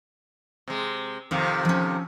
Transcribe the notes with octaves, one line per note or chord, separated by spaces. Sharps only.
C3 G#3
F2 C3 D#3 F5
F3 C#4